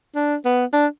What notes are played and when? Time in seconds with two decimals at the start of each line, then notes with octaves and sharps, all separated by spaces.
0.15 D4
0.45 B3
0.73 D4